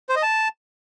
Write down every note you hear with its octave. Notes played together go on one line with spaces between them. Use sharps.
C5
D#5
A5